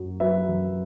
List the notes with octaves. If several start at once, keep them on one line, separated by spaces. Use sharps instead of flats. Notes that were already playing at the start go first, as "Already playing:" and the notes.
Already playing: F#2 F#3
F#3 B4 E5
F#2